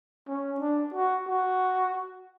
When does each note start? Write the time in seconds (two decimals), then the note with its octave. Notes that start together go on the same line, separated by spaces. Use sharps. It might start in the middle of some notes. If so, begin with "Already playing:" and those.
0.28 C#4
0.60 D4
0.94 F#4
1.28 F#4